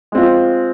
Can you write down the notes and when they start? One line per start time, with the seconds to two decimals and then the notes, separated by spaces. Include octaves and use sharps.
0.12 G#3 C4 F4